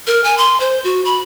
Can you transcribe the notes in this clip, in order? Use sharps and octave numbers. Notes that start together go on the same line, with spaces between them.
A#4
G#5
C6
C5
F#4
B5